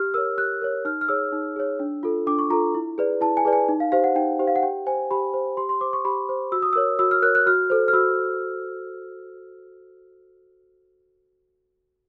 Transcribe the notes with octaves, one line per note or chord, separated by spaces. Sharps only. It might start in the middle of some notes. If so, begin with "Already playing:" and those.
Already playing: G4 F6
A#4 C#5 E6
G4 F#6
A#4 C#5
D#4 F6
F6
G#4 C#5 E6
D#4
G#4 C#5
D4
F4 A4
D4 D6
C#6
F4 A4 A#5
E4
G#4 B4 D5
E4 A5
G#5
G#4 B4 D5
G#5
D#4
F5
G4 C5 F5
F#5
D#4 G5
G4 C5
F5
F#5
G4 G5
C5 G#5
G4 B5
C5
G4 C6
C6
C5 D6
C#6
G4 B5
C5
F#4 E6
D#6
A#4 C#5 E6
F#4 E6
F6
A#4 C#5 F#6
F#6
F#4 F6
A4 C5
F6
F#4 E6